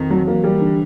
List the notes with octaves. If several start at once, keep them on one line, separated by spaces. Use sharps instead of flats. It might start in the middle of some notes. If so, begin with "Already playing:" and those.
Already playing: F2 D#3
F#3
E3 A#3
G3
D3